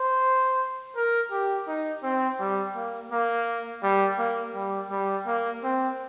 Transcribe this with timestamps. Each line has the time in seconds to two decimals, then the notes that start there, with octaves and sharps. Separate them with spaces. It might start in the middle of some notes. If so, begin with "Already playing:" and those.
Already playing: C5
0.96 A#4
1.32 G4
1.68 D#4
2.03 C4
2.40 G3
2.75 A#3
3.12 A#3
3.83 G3
4.19 A#3
4.54 G3
4.91 G3
5.27 A#3
5.63 C4